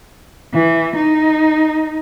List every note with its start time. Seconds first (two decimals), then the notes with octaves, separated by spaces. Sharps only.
0.54 E3
0.95 D#4